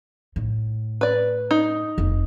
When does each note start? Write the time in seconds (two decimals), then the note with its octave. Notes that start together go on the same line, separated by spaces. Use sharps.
0.36 A2
1.01 B4 D5
1.51 D#4
1.98 F1